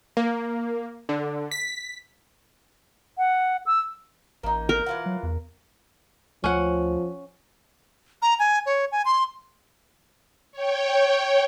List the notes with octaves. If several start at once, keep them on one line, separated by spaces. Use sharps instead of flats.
A#3
D3
B6
F#5
E6
A1 A#3 D#4
A#4
E3 F4 F#5
F#3
E2
D2 F3 C#4 F#5
A#5
G#5
C#5
G#5
C6
C#5 G5